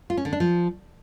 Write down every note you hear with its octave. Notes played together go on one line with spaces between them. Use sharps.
F4
C#4
D3
D4
F3